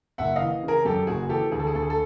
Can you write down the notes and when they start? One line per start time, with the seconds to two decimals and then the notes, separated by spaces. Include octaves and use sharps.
0.18 F#1 E5 F#5
0.36 D#5 F5
0.41 E3
0.63 C#3
0.68 G#4 A#4
0.85 F#2 G4 A4
1.07 F#1 F#4 G#4
1.29 E3 G4 A4
1.52 D2 G#4
1.60 A4
1.67 G#4
1.75 D2 A4
1.82 G#4
1.90 A4